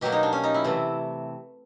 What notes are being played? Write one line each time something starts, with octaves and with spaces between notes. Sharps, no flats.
B2 F#3 A#3 G4
D#4
D4
C#4
D#4
E4
C3 E3 A3